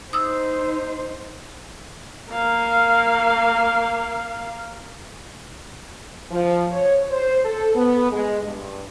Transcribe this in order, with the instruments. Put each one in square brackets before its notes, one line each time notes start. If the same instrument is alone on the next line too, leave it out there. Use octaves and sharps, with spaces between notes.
[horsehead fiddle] D#4 C5 [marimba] D#6 E6
[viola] A#3 F5
[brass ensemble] F3
C#5
C5
A4
B3
G#3
G2